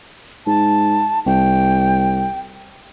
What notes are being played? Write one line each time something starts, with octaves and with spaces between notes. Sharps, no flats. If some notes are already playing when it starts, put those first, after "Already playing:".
G#2 A5
C2 G5